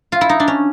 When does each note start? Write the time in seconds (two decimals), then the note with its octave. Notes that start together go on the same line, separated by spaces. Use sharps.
0.12 F4
0.21 E4
0.29 D#4
0.40 D4
0.48 C#4